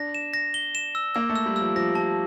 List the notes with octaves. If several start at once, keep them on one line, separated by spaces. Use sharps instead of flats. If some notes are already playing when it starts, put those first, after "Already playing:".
Already playing: D4 A#6
E7
A#6
G7
E7
E6
A#3 E6
A3
E6
G3
F3 E6
F3 A#6
F3 A5